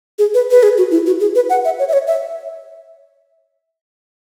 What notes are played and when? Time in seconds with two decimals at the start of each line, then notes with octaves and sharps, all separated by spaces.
0.19 G#4
0.34 B4
0.51 B4
0.63 G#4
0.78 F#4
0.91 E4
1.06 F#4
1.20 G#4
1.35 B4
1.50 F#5
1.65 E5
1.79 C#5
1.89 E5
1.93 C#5
2.07 E5